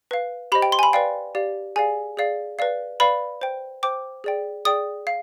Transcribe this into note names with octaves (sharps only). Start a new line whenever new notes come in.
B4 F5
G4 C5 D#5 B5
G5
C6
G#5
B5
B4 D5 F5 G5
G4 D5 F5
G#4 D5 F5 G#5
G#4 D5 F5
B4 D5 F5
B4 D5 F5 B5
C5 G5
C5 G5 D6
G#4 D5 G5
G#4 D5 G5 D#6
F5